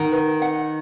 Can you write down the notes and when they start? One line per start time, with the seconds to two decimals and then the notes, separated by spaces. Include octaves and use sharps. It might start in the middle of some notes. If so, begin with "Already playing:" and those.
Already playing: D#3 F#5
0.12 B4
0.42 F#5